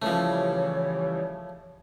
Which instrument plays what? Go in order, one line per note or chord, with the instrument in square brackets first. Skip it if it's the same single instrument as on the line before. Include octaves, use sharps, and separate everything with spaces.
[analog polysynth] C#3 E3 G3 [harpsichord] F3 A3 [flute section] C#5